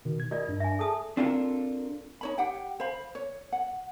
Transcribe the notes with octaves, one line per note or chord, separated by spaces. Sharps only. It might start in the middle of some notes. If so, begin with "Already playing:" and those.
B2 D#3
G#6
F4 A#4 D5 D#5
G2 D4
E5 G#5
G#4 A4 A5 D#6
C4 D4 F4 A4 A#4
D#4 C#5 B5
G4 F#5 G5
C5 F5 B5
C#5
F#5